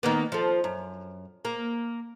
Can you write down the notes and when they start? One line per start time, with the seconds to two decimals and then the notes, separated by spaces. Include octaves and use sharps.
0.03 D#3 A#3 B3
0.32 F3 A4
0.64 F#2
1.45 A#3